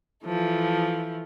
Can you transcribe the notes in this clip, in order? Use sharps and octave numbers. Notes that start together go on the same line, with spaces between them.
E3 F3 A3